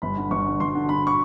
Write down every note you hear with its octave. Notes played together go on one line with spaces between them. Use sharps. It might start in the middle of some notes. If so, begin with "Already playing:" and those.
G1 B5
D3
G1 C#6
D3
G1 C6
D3
D3 B5
C#6